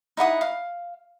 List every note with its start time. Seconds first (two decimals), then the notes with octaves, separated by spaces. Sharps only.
0.17 D#4 E4 F#5 D#6
0.41 F5